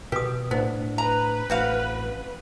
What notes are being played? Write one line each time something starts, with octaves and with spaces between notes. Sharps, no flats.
B2 G4 B4 D#6
A2 B3 D4 C5
B4 A#5
A1 C4 F#4 F5